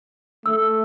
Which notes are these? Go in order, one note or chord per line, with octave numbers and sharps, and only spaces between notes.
A3 E6